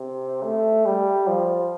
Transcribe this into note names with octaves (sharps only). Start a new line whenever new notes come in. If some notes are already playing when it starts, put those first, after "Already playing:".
Already playing: C3
A3
G3
F3